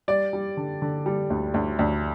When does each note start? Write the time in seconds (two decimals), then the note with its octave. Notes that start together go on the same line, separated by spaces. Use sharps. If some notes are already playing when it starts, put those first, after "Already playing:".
0.08 G3 D5
0.33 G3
0.57 D3
0.82 D3
1.06 G3
1.30 D2
1.54 D2
1.79 D2